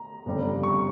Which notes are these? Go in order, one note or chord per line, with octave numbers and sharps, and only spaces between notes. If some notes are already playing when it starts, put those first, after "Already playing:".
Already playing: A#5
G1 F2 C#3 G3
C#6